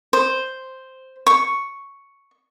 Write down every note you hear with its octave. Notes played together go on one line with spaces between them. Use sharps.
C5
C#6